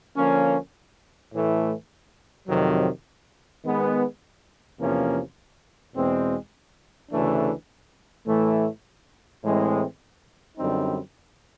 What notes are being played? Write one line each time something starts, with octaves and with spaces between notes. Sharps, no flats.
D3 F3 A#3 C#4
A2 E3 A3
F2 C3 D#3 F#3
D#3 G#3 B3
E2 C3 F3 A#3 C#4
E2 B2 G#3 C4
D2 C#3 E3 A3 D4
A2 E3 A3
A2 E3 G#3 C4
F#2 D3 G3 C4 D#4